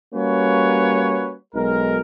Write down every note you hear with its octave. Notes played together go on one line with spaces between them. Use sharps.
G3 A#3 C#4 F#4 B4 C#5
B1 G#3 A#4